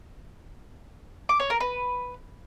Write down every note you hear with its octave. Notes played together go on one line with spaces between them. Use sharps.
D6
C#5
A#4
B4